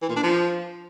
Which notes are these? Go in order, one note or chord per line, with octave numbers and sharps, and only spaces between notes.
E3
A#2
D4
F3